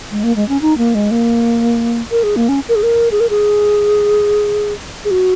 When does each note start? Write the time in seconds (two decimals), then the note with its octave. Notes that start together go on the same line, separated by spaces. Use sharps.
0.12 G#3
0.23 A#3
0.36 G#3
0.49 C#4
0.62 D#4
0.78 A#3
0.95 G#3
1.11 A#3
2.11 A#4
2.23 G#4
2.36 A#3
2.49 C#4
2.69 A#4
2.76 G#4
2.83 A#4
3.12 G#4
3.20 A#4
3.30 G#4
5.05 G#4
5.11 F#4